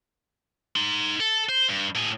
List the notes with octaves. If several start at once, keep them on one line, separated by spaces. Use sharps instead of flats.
D#4 C6
A4
C5
G2
A2 G#4